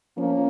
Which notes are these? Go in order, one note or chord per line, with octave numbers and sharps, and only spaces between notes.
F3 A#3 C#4